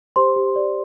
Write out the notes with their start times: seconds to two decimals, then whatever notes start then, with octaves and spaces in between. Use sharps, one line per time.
0.16 G4 C5 C6
0.36 G4
0.56 D5